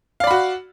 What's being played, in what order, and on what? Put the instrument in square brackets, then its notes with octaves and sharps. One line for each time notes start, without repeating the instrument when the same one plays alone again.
[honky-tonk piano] F5
D5
B5
F#4